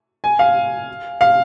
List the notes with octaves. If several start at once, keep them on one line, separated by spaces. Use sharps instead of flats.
G#5
F5
F5